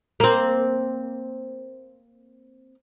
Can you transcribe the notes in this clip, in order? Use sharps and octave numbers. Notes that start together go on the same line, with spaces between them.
A#3 C4